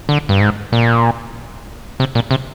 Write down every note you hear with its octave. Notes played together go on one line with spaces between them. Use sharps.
D3
G2
G#2
A#2
C3
A#2
C3